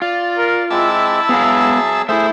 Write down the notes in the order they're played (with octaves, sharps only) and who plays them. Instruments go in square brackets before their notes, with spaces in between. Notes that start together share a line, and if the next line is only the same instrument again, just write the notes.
[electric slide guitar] F4 [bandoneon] D5
[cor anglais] A#4
[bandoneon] G#3 C4 D6 [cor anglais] E4 [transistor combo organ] E5 A5
[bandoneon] F#3 G#4 [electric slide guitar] B3 F5
[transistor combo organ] A3 [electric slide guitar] E4 E5 [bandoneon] G#4 C5